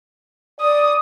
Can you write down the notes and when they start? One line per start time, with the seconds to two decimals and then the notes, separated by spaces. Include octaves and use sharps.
0.61 D5 D#6